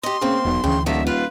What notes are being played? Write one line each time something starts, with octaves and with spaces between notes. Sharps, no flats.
G4 D#5 C6
C#3 A#3 C4
E1 B1
D2 C#3 E3 G5
D#1 D3 D#3 E5
F4 B4